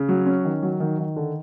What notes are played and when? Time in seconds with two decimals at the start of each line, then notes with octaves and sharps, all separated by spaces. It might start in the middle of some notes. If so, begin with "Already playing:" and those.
Already playing: C#3
0.09 F#3
0.26 C#4
0.45 D#3
0.62 F#3
0.80 D#3
0.99 D#3
1.16 D3